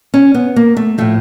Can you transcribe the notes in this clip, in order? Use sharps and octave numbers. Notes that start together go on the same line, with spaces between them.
C#4
B3
A#3
A3
A2 F3 A3